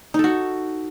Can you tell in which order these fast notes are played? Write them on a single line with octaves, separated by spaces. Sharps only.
D#4 A4 F#4